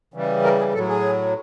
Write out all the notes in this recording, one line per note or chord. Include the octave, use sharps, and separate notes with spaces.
C#3 E3 G3
A#4
G#4
A2 F#3 A4
G#4